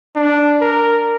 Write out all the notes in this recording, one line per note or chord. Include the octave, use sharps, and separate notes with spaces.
D4
A#4